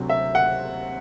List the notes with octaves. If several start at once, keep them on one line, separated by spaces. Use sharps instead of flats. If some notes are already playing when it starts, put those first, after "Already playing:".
Already playing: D2 C3 F#3
E5
F#5